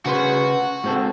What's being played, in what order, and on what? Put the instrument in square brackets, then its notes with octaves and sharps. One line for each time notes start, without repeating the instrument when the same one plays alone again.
[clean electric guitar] C#3 B4 C6 [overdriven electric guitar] F#4
[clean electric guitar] G#2 C4 A4